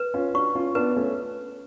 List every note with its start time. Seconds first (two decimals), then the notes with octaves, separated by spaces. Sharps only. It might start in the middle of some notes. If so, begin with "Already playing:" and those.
Already playing: B4
0.14 C#4 F4
0.34 D4 F#4 C#6
0.55 C#4 F4
0.75 B3 D4 B4
0.96 A3 C#4